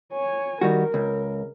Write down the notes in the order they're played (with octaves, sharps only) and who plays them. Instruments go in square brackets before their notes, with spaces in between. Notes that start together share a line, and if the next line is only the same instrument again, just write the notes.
[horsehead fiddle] C#5 G#5
[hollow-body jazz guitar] D#3 G3 F#4 [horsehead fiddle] A#4
[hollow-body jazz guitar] C#2